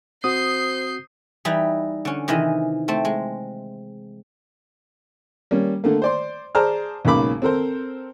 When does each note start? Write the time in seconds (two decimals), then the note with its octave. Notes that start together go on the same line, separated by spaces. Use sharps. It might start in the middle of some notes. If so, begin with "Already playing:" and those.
0.24 C4 F#4 C5 D#6 G6 C7
1.45 E3 G3 D#4 E4
2.05 D3 C#4
2.28 C3 D#3 E3 G#4 D#5
2.88 A3 C4 A5
3.05 G#3
5.51 G3 A#3 C#4
5.84 D3 A3 A#3
6.02 C5 D5 C6
6.55 G#4 C5 D5 A5 A#5 F6
7.05 B1 G#2 C#3 A#3 B5 D6
7.42 C4 A4 A#4 C5